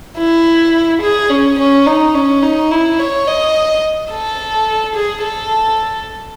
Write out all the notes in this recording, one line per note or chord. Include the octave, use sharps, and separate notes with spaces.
E4
G#4
C#4
C#4
D#4
C#4
D#4
E4
C#5
D#5
A4
G#4
A4